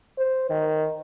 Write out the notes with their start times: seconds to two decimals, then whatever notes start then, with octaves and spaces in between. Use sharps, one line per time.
0.18 C5
0.50 D#3